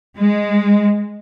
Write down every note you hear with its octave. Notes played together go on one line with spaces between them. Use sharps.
G#3